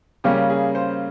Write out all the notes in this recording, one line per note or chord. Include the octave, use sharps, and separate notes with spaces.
C#3 G3 A#3 C#4 G4
G#4
C5